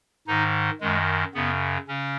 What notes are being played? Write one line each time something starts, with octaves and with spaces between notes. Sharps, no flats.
G#2 D#3 D#4
F#2 D#3 G#3
F#2 C#3 B3
C#3 C#4